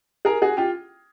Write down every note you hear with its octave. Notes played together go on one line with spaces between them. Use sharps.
G#4 A#4
F#4 G#4
F4 G4